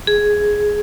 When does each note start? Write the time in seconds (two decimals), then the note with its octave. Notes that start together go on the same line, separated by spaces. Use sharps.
0.07 G#4